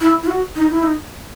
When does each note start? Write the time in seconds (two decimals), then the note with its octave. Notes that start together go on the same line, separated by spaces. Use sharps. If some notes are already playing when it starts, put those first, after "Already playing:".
0.01 E4
0.23 E4
0.27 F#4
0.56 D#4
0.71 E4
0.83 D#4